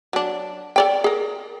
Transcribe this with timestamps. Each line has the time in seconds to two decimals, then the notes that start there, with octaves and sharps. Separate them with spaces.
0.13 F#3 D4
0.76 A4 D5 G5
1.04 G#4 A#4